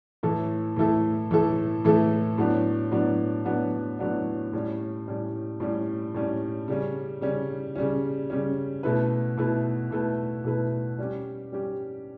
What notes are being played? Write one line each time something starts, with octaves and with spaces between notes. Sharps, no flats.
A2 E3 A3 E4 A4
A2 E3 A3 E4 A4
A2 E3 A3 E4 A4
A2 E3 A3 E4 A4
A2 F#3 B3 D4
A2 F#3 B3 D4
A2 F#3 B3 D4
A2 F#3 B3 D4
A2 G3 C#4
A2 G3 C#4
A2 G3 C#4
A2 G3 C#4
C#3 G3 C#4
C#3 G3 C#4
C#3 G3 C#4
C#3 G3 C#4
B2 A3 E4 B4
B2 A3 E4 B4
B2 A3 E4 B4
B2 A3 E4 B4
G3 C#4 G4
G3 C#4 G4